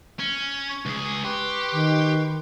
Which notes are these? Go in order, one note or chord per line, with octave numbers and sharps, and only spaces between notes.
C#4
C#6
C#2 G#4
G4 B4 C6 C#6
D#3